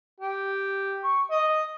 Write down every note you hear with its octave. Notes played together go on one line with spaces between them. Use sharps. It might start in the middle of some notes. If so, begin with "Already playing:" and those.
G4
C#6
D#5